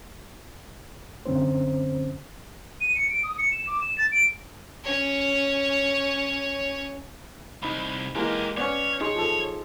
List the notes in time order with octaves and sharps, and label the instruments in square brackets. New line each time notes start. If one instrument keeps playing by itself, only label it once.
[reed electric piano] F#2 D3 C4 C#4 C5
[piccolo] D#7
C#7
D7
D#6
C#7
E7
D6
E7
A6
D7
[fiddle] C#4 C#5
[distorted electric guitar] C2 [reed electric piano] D#4 B5
[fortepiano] E3 G#3 A#3 [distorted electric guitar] G4 A#4
[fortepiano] B3 C#4 [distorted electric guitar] C#5 [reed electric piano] D5
[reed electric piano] D#4 G#4 C6 [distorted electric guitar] C#5
[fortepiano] F3 A4